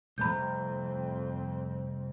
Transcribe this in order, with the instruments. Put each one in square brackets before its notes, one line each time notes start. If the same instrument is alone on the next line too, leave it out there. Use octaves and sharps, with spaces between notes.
[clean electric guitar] C2 A3 A#5 [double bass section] F2 C4 [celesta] B5 G6